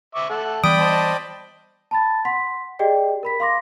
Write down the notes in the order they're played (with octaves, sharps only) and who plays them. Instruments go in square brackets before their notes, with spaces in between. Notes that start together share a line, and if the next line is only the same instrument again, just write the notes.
[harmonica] E5 C#6 D6
A3 A4 F#5
[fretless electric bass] E3 G3 B3 [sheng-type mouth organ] D5 G5 B5 [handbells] D#6 D7
[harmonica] C5 D#5 A5
[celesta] A5 B5 A6
F#5 C6 B6
G4 G#4 D5 D#5 G5
A#4 B5 B6
F5 C6 D6 A#6